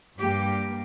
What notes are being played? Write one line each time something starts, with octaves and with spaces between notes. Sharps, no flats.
G2 G3 A#3 G4